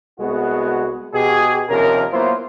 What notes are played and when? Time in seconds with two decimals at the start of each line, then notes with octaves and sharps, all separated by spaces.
0.19 C2 G#3 B3 F#4
1.14 B2 G4 G#4
1.70 D#2 C3 F3 C#4 A#4
2.12 F#3 A#3 B3 E4 F4 C5